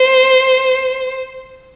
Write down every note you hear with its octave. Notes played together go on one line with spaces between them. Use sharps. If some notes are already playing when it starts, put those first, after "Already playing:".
Already playing: C5